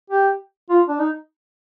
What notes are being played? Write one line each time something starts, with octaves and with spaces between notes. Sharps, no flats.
G4
F4
D4
D#4